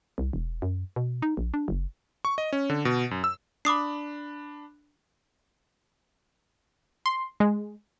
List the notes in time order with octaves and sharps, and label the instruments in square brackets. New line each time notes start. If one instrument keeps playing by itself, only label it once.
[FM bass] C2
E1
F#2
B2
D#4
A#1
D4
F#1
[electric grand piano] C#6
D#5
C#4
D3
B2
F#2
E6
[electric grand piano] D4 B5 [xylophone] D6 D#6 C7
[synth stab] C6
G#3